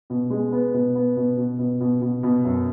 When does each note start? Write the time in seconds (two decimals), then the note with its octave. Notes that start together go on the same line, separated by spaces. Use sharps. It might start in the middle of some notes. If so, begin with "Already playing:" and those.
0.10 B2
0.30 G#3
0.52 B3
0.74 B2
0.95 B3
1.16 B2
1.38 B2
1.59 B2
1.80 B2
2.02 B2
2.23 B2
2.44 F#2